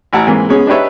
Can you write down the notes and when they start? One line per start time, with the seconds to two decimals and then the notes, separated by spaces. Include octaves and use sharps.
0.13 A1 E4 F#5 A5 A#5
0.27 G#2 E3 A#3 C4
0.49 G#3 B3 C#4 G#4
0.67 D4 D#4 G4 B4 C#5 E5